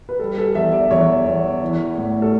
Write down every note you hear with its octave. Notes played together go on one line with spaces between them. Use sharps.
B4
G3 A4
A4
E2 E5
D5
E2 C#5
E2
E3
A2
A4